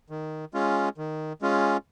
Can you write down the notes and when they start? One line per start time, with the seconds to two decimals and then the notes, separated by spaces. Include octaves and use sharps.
0.10 D#3
0.54 G#3 C#4 F4
0.98 D#3
1.42 G#3 C#4 F4